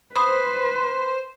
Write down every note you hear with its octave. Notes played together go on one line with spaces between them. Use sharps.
B4 C5 B5 D#6